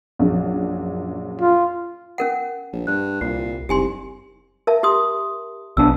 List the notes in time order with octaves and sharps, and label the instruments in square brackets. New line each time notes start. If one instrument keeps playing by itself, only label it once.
[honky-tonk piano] A#1 F#2
[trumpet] F4
[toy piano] C#4 A#4 F#5
[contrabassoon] A#1
[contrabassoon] G2 [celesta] F#6
[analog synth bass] C2 [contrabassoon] A#2 [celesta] C7
[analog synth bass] F#1 [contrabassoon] C2 [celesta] D#4 [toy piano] G4 G#5 C6
[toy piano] A#4 E5 A5
G4 C6 D#6
[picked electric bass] B1 B3 D4 [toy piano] E6